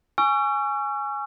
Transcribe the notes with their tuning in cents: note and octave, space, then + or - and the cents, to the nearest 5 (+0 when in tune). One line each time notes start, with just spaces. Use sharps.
G#5 +0 C#6 +15 E6 +45